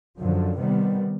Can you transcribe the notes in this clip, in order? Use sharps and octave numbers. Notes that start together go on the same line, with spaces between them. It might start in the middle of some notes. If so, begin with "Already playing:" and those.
F#2 D3 F3
C3 D#3 G3 B3